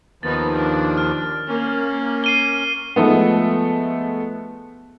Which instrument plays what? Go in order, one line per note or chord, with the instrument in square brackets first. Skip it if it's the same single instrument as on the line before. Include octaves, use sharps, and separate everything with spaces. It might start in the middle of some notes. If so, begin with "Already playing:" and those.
[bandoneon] D#2 D#3 F3 [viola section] B3 D#4 [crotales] A6
[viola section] D4
[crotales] F6
[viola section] A#3 [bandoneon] C#4
[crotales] C7 D#7 G7
[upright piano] F3 G#3 A3 B3